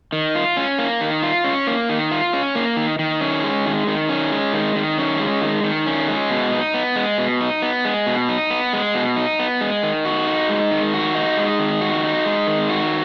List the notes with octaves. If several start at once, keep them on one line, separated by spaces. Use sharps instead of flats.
D#3
F4
C#4
A#3
D#3
F4
C#4
A#3
D#3
F4
C#4
A#3
D#3
D#3
C#4
G#3
D#3
D#3
C#4
G#3
D#3
D#3
C#4
G#3
D#3
D#3
C#4
G#3
B2
D#4
B3
G#3
B2
D#4
B3
G#3
B2
D#4
B3
G#3
B2
D#4
B3
G#3
D#3
F#4
D#4
G#3
D#3
F#4
D#4
G#3
D#3
F#4
D#4
G#3
D#3
F#4